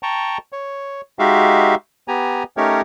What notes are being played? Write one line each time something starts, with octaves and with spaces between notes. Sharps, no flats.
G5 A5 A#5 C#6
C#5
G#3 D#4 F#4 G4 E5 F5
B3 G4 G#5 A#5
A3 C#4 D#4 G4 A#4 C#5